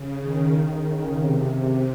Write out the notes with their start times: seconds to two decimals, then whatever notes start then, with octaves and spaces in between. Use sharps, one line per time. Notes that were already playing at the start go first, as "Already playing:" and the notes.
Already playing: C#3
0.19 D#3
0.83 C#3
1.15 C3